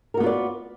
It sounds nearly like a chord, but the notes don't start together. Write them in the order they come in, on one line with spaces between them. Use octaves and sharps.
A#4 F#4 B3 F4 D5